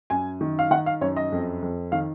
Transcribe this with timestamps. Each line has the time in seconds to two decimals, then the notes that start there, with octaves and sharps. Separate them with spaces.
0.10 F#2 G#5
0.41 D#3
0.59 F5
0.70 D#3 F#5
0.86 F5
1.01 F#2 C#5
1.16 D#5
1.32 F2
1.62 F2
1.92 D#3 F5